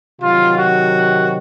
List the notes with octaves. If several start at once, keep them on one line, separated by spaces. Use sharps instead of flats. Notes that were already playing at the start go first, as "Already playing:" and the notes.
C3 D#3 F#3 F4
F#4